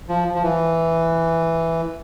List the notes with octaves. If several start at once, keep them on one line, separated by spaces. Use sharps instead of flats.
F3
F3
E3